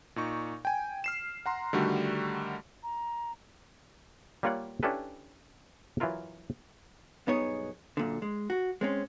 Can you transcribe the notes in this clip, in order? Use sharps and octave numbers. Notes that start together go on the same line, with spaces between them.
A#2 D#4 C#6
G5 G#5
F6 C7 E7
F#5 A#5 C6
D3 D#3 G3 A3 F#4
A#5
G3 A#3 F4 C#5 D5 F#5
C#4 D4 E4 G4 A4 B4
E3 F#3 E4 F4 A#4
B1 G2 B3 D#4 G#4 C#5
F#2 A#2 D3
G#3
F#4
G#3 C4 C#4